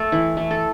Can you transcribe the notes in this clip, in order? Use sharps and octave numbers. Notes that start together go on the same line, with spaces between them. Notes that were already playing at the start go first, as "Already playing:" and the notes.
Already playing: A3 A4
E3
A3
A4